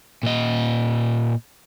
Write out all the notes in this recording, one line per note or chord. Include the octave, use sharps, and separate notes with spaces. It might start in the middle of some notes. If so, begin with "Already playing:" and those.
A#2 D#5